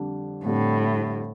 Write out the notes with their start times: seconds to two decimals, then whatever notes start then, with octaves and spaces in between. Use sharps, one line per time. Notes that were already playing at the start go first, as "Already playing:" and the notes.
Already playing: F2 D3 G3 D4
0.45 F2 A2 D3 G3 D4